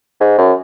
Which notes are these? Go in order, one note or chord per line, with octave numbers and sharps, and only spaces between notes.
G#2
F#2